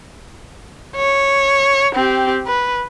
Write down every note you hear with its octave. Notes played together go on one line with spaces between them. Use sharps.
C#5
C4 G4
B4